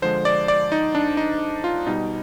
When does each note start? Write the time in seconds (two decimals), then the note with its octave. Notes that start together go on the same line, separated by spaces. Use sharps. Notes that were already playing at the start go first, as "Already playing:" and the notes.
0.02 D3 F3 G#3 C5
0.25 D5
0.48 D5
0.72 D#4
0.95 D4
1.17 D#4
1.64 F4
1.87 B2 G3 D#4